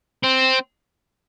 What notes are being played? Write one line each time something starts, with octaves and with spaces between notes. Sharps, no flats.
C4